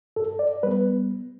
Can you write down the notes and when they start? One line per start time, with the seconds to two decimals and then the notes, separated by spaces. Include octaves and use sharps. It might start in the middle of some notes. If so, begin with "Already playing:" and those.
0.16 G2 A4
0.39 D5
0.63 G3 B3 B4